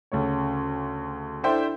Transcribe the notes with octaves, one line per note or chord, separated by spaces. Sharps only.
D2 C#3 A3 C#5
D4 E4 A4 C5 E5 G5